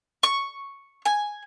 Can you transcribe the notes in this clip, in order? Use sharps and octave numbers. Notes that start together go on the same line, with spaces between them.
C#6
G#5